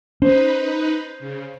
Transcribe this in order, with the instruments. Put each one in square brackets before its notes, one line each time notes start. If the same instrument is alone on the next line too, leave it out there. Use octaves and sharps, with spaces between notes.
[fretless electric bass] C#4 [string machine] D#4 B4 [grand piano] C5
[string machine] C#3